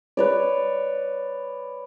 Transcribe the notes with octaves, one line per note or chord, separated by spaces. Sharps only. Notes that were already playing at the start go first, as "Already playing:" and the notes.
B4 C#5 D5